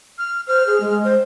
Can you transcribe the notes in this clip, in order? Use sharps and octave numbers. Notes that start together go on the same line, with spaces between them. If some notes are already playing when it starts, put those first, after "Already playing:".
F6
C5 F6
G#4
G#3
C5